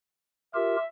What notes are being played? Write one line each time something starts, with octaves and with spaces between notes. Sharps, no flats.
F4 G4 A#4 E5